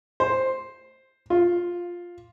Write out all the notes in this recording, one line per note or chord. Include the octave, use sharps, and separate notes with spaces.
C5
F4